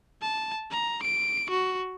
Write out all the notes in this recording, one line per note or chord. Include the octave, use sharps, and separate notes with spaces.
A5
A#5
D7
F#4